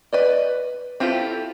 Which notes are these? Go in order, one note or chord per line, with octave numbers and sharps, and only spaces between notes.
B4 D5 D#5
C4 E4 F4 G4 A4